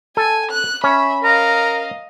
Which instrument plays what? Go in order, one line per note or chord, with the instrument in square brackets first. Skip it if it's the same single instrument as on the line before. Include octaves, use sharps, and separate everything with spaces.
[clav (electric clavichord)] A4 [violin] G#5
[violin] F#6
[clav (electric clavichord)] C#4 [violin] E5 B5
[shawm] A#4 [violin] D#5 F5